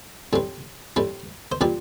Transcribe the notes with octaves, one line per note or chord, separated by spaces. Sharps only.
A2 G3 C4
A2 G3 C4
C5
A#2 G3 C4 D5